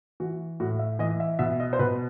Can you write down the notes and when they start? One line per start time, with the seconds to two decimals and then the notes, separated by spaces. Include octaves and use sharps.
0.20 E3 F#4
0.60 A2 F#4
0.79 E5
0.99 E3 D#5
1.20 E5
1.39 B2 E5
1.60 D#5
1.73 C5
1.79 B2 B4